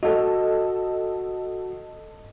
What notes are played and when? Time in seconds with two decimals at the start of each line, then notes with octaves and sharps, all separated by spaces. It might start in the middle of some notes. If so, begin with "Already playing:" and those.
0.03 F#4 A4 D#5